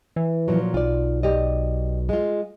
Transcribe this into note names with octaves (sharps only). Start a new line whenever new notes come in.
E3
A#2 F3 F#3
B1 F4 D5
G4 D5 D#5
G#3 F4